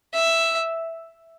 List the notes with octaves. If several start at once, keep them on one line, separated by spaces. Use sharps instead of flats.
E5